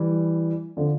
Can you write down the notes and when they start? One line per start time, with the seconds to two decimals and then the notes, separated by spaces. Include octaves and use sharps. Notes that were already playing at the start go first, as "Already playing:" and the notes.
Already playing: E3 G3
0.77 D3 F3